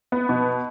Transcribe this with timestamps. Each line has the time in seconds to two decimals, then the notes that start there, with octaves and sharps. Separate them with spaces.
0.12 B3
0.29 B2